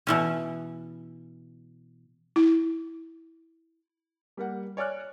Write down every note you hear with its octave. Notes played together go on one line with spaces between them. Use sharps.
B2 E3 C#4
E4
G3 A#3 F#5
C#5 D5 G#5 F6 F#6